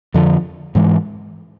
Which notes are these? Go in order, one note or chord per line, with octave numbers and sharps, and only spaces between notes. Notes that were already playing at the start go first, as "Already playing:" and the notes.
F2 D3 F3
G#2 E3 G#3